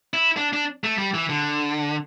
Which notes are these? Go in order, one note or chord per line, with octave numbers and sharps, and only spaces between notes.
E4
D4
D4
A3
G3
E3
D3